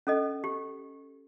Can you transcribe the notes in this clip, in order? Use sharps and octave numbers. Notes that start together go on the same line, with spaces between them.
C#4 A4 D#5
G4